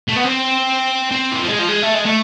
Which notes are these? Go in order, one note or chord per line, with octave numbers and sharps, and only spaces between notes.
A3
B3
C4
C4
E3
F3
G#3
F3
G#3
A3
G#3
A3